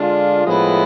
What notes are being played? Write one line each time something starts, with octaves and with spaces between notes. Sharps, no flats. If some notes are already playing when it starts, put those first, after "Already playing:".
Already playing: D3 G#3 D4 F4
A2 F3 G#3 B3 E4